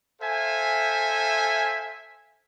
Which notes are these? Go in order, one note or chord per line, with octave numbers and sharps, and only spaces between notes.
A4 C5 E5 F5 G#5